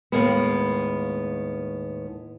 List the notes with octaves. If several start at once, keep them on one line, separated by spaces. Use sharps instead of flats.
D#2 A2 G#3 A#3 B3